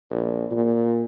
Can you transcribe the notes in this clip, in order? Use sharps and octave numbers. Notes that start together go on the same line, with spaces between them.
A#1
A#2